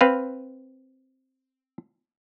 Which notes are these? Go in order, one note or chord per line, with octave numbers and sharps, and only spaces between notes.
C4 B4 F5